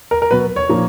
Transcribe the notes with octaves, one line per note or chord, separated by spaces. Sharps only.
A#4
A#4
B2 F#3 B3 B4
C#5
A#2 F3 A#3